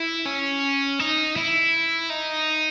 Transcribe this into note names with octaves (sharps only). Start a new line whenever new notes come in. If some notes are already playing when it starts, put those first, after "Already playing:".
Already playing: E4
C#4
D#4
E4
D#4